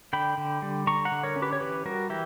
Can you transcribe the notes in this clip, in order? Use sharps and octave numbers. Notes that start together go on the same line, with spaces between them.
D3 G5 B5
D3
G3
D3 A#5 C#6
F#5 A#5
D3
A#4 C#5
C#4
G4 B4
C#5
E3 G4 B4
G3 F#4 A#4
E3 E4 G4